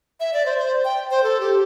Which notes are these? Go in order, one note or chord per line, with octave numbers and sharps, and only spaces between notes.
E5
D5
C5
C5
G5
C5
A4
G4